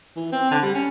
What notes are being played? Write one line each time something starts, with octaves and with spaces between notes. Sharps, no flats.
E3
C4
D3
G3
C#4